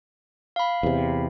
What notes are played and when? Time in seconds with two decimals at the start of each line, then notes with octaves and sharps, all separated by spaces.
0.56 F5 B5
0.83 E2 C3